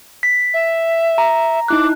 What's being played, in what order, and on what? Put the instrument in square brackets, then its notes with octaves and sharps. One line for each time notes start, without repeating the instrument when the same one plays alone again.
[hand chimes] B6
[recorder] E5
[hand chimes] A#5
[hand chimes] D#4 E4 F#6 [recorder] D6